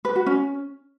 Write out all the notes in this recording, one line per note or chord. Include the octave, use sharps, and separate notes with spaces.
B4
F#4
C#4